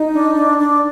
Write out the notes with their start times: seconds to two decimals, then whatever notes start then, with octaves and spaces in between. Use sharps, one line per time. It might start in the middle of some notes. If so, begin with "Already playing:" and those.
Already playing: D#4
0.11 D4
0.34 D4
0.57 D4